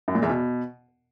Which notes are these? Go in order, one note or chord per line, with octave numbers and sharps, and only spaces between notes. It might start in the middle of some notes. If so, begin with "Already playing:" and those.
F#2
A#2
E2
B2